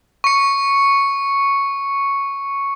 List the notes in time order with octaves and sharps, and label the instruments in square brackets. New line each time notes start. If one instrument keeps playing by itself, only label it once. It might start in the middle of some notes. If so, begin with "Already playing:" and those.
[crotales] C#6 C#7